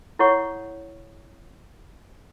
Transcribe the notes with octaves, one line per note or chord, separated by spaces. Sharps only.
E4 A4 C#5 F#5 C#6